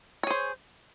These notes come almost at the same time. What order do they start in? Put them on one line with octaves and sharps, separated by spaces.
C#5 G#4 C5